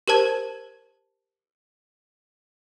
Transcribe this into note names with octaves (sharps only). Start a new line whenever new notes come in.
G4 A#4 C5 A5 G#6